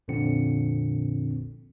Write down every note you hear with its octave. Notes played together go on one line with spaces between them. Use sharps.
A#1 F2 A#2 D3 C4 C#7